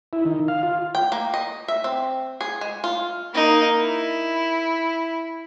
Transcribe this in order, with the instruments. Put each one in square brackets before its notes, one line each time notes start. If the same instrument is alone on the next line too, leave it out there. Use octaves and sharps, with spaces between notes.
[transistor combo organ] E4
D#3
F5
F4
[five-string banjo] G5
A#3
D#5
E5
C4
G#4
G#3
F4
[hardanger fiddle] A#3 D#4
E4